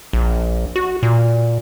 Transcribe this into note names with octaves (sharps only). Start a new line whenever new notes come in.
A#1
F#4
A#2